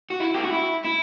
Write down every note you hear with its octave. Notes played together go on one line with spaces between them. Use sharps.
F#4
E4
G4
F#4
E4
E4